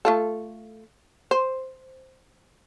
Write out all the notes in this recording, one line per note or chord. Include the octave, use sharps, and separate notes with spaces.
A3 F4 A4
C5